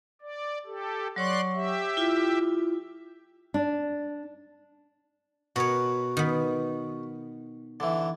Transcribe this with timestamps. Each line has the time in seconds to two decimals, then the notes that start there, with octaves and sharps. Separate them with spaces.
0.22 D5
0.66 G4 A4
1.16 F#3 C#5 D5 C6 C#6 F#6
1.54 G4 E5
1.97 E4 F4
3.54 D4
5.56 B2 F#4 A#4 B4 C#5
6.17 D#3 B3
7.80 D3 E3